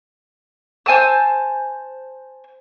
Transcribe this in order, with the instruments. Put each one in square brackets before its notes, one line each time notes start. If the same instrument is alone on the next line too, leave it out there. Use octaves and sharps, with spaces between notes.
[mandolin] C5 G#5 A5 E6